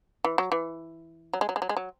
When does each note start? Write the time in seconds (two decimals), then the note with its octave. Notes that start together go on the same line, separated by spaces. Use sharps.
0.24 E3
0.38 F#3
0.52 E3
1.33 F#3
1.41 G#3
1.49 F#3
1.56 G#3
1.62 F#3
1.69 G#3
1.77 F#3